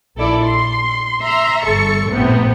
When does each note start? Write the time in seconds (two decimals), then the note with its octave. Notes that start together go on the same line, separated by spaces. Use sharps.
0.17 A#1 E4 A4 D5
0.45 C6
1.22 E5 A#5 C6
1.63 G1 A4 C#6 C#7
2.10 A#1 A2 C3 B3